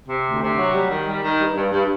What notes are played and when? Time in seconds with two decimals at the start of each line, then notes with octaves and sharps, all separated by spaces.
0.08 C3
0.25 D2
0.42 C3
0.58 F#3
0.74 G3
0.90 D#3
1.06 G3
1.24 D#3
1.40 G2
1.56 G2
1.72 G2